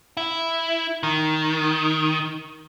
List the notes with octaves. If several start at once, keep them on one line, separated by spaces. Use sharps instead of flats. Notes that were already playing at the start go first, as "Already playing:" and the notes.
E4
D#3